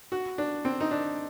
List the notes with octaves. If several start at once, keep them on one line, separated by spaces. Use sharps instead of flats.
F#4
D4
C4
D#4
D4